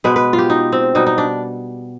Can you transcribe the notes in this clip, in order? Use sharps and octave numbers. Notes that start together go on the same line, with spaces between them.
B2 G#3 B4
B4
F4
G4
D#4
C4
B2 G3 D#4
D#4
D4